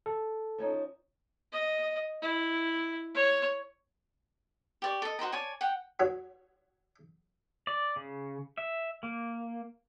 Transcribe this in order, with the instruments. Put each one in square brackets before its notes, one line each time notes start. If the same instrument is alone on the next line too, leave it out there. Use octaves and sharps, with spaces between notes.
[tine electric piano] A4
[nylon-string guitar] F3 C#4 D#4
[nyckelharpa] D#5
E4
C#5
[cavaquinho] G4 D5 C#6
A4 D#5
F#4 C5 D#5 A#5
C#5 D5 G#5 A5
F#5 G5
[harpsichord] F#4 C#5
[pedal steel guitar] D5
C#3
E5
A#3